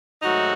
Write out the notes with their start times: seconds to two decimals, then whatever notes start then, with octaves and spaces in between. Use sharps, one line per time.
0.22 G#2 D#3 F#3 A3 D#4 F#4